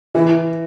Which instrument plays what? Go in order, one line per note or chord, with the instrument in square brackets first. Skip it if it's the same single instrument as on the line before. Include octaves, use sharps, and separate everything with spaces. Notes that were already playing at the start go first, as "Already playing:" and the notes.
[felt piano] E3 [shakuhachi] E4